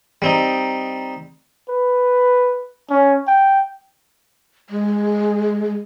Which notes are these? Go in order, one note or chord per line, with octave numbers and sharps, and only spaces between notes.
G3 C4 D#4
B4
C#4
G5
G#3